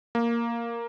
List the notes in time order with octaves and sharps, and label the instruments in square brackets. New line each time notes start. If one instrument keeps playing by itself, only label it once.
[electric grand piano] A#3